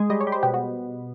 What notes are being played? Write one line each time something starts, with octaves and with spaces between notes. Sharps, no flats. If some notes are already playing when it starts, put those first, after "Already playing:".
Already playing: G#3
G3 D#5
C#5
G3
C5
B2 G4
F#4